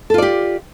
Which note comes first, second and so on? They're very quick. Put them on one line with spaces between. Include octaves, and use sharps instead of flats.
A4 F4 D5 G4